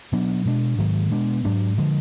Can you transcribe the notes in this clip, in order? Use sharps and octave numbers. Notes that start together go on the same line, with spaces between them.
B2 F#3 B3 D4
B2 G#3 B3 D4
G#2 D#3 F#3
B2 G#3 B3 D4
G#2 F#3 D4
D3 F3 G#3